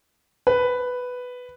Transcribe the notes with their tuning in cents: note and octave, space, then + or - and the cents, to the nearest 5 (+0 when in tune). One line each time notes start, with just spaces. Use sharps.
B4 +5